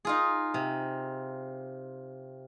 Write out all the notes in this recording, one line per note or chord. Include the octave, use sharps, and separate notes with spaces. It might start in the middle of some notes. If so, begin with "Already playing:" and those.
D#4 F4 G#4
C3